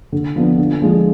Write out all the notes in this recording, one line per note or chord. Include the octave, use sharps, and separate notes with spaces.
D3
F3 B3 D4
D3
F3 G#3 D4